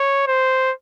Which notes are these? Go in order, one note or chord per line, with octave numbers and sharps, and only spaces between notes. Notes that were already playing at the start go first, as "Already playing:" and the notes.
Already playing: C#5
C5